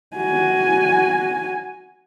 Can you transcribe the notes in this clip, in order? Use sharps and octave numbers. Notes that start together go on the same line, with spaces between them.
F#4 G#5